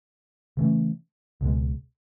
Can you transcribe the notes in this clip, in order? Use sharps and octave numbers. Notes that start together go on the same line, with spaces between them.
C#3 E3 A3 C#4
C#2 B2 G#3